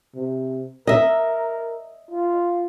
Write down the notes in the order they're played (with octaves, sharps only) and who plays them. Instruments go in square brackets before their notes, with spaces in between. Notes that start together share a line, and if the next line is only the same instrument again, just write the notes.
[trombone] C3
[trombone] A#4 [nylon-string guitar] D#5 E5
[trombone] F4